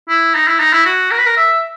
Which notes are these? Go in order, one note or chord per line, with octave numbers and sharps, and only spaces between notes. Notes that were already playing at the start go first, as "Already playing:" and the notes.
E4
D#4
E4
D#4
E4
F#4
A#4
B4
A#4
E5